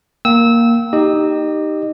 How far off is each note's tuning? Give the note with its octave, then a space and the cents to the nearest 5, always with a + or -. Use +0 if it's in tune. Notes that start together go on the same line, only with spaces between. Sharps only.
A#3 +0 G5 -25 E6 -20
D#4 +0 G4 +0 D#5 -25